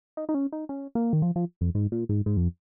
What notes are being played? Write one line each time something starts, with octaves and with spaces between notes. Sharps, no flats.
D#4
D#4
C#4
D#4
C#4
A#3
D#3
F3
F3
F2
G#2
A#2
G#2
G#2
F2